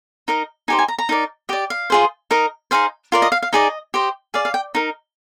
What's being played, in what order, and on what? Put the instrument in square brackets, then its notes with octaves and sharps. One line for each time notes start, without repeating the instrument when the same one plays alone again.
[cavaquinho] D#4 A#4 D#5
D#4 G4 C5 G#5
G#5
A#5
A#5
D#4 A#4 D5
G4 D5 D#5
F5
F4 G#4 C5
D#4 A#4 D#5
D#4 G#4 C5 F5
F4 A#4 D5
D#5
F5
F5
D#4 G#4 D5 D#5
G4 C5 D#5
G#4 D5 F5
F5
G5
D#4 A#4